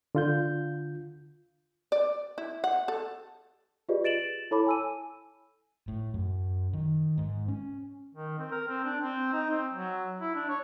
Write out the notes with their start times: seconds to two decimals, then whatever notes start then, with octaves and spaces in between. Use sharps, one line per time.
0.15 D3 F4 G6
1.92 D5
2.38 E4
2.64 F#5
2.88 A4
3.89 F4 G4 G#4 B4 D5 D#5
4.04 A6 D7 E7 F#7
4.51 E4 A4 C#5 A5 B5 D6
4.67 G#5 E6 D#7
5.88 A2
6.14 F#2
6.73 D#3
7.18 G#2
7.48 C#4
8.15 D#3
8.38 C4
8.51 A#4
8.67 C4
8.85 D4
9.01 C4
9.33 D#4
9.50 C4
9.73 F#3
10.20 E4
10.35 D4
10.49 C#5